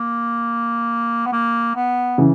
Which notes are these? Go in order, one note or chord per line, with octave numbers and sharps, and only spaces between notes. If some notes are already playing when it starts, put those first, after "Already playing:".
Already playing: A#3
B3
A#3
B3
C#3 E3